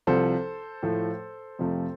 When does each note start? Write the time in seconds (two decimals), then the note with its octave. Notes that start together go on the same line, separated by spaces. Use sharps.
0.07 C2 C3 F3 A4 C5
0.83 A2 F3 A3
1.59 F2 C3 F3 A3